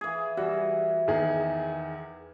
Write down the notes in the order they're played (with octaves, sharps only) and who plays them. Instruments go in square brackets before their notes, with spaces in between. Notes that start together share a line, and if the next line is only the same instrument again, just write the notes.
[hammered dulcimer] E3 G#4
[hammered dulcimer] E3 [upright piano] G3 F#4
[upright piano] E2 D#3 G#4